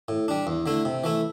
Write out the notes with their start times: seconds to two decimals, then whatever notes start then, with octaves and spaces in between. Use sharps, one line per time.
0.08 A2
0.28 G3 D4
0.47 E2
0.66 D3 A3 E4
0.85 C3
1.04 E3 A3 E4